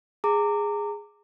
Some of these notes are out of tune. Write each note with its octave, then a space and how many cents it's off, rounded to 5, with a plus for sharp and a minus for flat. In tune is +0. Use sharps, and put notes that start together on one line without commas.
G#4 -10 A#5 -30 D6 +0